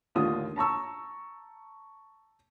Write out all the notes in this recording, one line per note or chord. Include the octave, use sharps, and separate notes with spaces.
D#2 A2 D3 F4 D#6
A5 A#5 C#6 E6